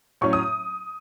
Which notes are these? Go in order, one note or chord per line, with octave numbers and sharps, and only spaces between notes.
A2 F#3 C#4 C#6
D#6